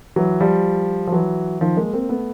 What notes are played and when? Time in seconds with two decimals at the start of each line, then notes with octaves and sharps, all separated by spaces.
0.16 E3 F#3
0.40 F3 G3
1.07 F3
1.12 E3 F#3
1.61 D#3 F3
1.77 G#3 A#3
1.93 A#3 C4
2.09 A3 B3